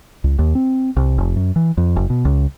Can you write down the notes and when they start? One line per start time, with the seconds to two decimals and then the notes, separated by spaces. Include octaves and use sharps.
0.24 C#2
0.39 D#2
0.55 C4
0.96 C2
1.18 F1
1.36 F#2
1.56 E3
1.77 F2
1.96 F#1
2.10 B2
2.25 C#2